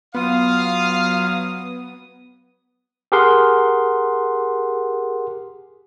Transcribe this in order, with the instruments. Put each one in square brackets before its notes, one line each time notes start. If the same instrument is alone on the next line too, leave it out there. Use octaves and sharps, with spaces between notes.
[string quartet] F#3 D#6 [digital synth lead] B3 [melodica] F4 [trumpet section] F5
[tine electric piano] G4 G#4 A#4 F#5 C6